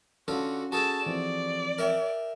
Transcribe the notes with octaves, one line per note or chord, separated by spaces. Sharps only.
D3 C#4 F4 F#4 A4
F#4 G#4 A4 A5
E3 F3 C4 D5
A#4 E5 G5